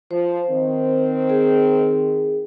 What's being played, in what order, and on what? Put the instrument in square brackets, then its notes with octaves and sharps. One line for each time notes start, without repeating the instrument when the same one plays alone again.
[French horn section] F3 [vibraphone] C5
[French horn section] D#3 C4
[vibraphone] G#4